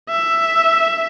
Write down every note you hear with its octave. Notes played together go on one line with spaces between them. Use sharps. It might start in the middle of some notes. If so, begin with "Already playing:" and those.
E5